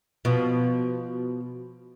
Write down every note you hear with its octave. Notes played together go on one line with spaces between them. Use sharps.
B2 F3